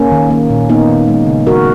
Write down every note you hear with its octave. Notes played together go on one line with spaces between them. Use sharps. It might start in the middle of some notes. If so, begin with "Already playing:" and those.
Already playing: A#3 C#4
D#3
A#3
A#2
A#3 B3 D#4
D#3
G#3
C#3
D#3 F#4 A#4